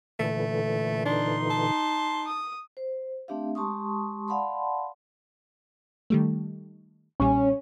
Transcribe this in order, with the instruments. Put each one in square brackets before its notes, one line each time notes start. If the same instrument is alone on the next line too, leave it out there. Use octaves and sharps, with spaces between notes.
[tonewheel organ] A#2 D3 E3 [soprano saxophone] A3
[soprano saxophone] D4 [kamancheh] D#4 C6
[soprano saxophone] A5
[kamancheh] D#6
[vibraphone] C5
A3 C4 D4 G4 E5 F5
G#3 G4 A5 C6 C#6 D#6
D5 F5 F#5 A5 B5 C6
[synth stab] D#3 G3 A3
[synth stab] B1 A#2 G3 [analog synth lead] C#4